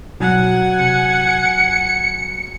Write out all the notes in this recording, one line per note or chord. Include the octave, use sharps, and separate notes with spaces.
B2 F#3 F#5 G#5
C3 C#7
F1